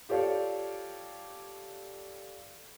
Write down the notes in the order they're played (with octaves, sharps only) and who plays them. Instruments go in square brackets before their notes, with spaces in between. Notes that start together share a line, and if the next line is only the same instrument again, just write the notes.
[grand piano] F4 G4 A4 C#5 D5 F5